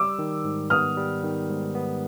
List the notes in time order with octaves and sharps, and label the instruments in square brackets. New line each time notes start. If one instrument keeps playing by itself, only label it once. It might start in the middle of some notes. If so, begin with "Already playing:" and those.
Already playing: [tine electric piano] G3 [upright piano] D6 E6
[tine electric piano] D#3
G#2
[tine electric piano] B3 [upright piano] D#6 F6
[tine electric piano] G3
D#3
G#2
B3